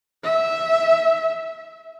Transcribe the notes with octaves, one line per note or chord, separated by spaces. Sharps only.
E5